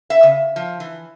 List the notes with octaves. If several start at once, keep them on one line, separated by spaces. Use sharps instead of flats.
E5
C#3
F3
E3